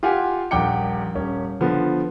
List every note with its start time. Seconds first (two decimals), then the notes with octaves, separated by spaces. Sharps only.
0.03 F4 G4 F#5 G#5
0.51 D#1 A#1 F#5 G5 D6 C#7
1.15 D#1 C#4
1.61 D3 F3 B3